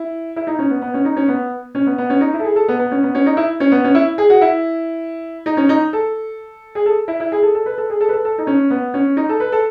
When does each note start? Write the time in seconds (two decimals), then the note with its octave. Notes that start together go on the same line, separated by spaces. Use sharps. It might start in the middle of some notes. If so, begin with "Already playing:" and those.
Already playing: E4
0.36 E4
0.47 D#4
0.59 C#4
0.70 B3
0.82 B3
0.94 C#4
1.05 D#4
1.16 C#4
1.28 B3
1.75 C#4
1.87 B3
1.98 B3
2.10 C#4
2.21 D#4
2.34 E4
2.39 A4
2.44 G#4
2.56 A4
2.68 B3
2.79 B3
2.91 C#4
3.03 B3
3.15 C#4
3.26 D#4
3.37 E4
3.60 C#4
3.72 B3
3.84 C#4
3.95 E4
4.18 G#4
4.30 F#4
4.41 E4
5.46 D#4
5.57 C#4
5.69 D#4
5.93 A4
6.75 G#4
6.86 A4
7.08 E4
7.20 E4
7.32 G#4
7.43 A4
7.55 A4
7.66 B4
7.78 A4
7.90 G#4
8.01 A4
8.09 B4
8.13 A4
8.25 A4
8.38 D#4
8.47 C#4
8.70 B3
8.94 C#4
9.17 D#4
9.29 A4
9.40 B4
9.52 A4